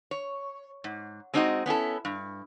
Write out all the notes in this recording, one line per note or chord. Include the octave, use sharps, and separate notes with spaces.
C#5
G#2
G#3 C4 D4 D#4 F#4 D#5
B3 C#4 E4 A4
G2